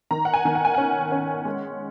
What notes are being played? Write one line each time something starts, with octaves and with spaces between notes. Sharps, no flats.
D#3 A#5
F#5
G#5
D#3
F#5
G#5
C#4 F#5
C#4
G#3